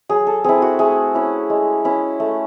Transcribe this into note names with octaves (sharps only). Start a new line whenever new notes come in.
F#3 G#4
A4
C4 E4 G#4
F#4
A3 G#4
C#4 E4
G#3
C#4 E4
A3